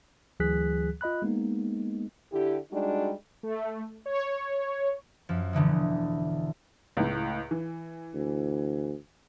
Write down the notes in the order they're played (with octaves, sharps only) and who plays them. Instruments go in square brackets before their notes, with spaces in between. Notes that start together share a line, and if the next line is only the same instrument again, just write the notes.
[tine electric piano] D2 E3 F#3 G#4 F#6 B6
F4 D#5 B5 F#6
G#3 A#3 B3 D#4
[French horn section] D3 E4 G4
G3 G#3 D4 D#4 F#4
[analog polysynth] A3
C#5
[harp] F#2 F3
E1 D3 E3 G#3
[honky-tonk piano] C#2 A2
E3
[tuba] D2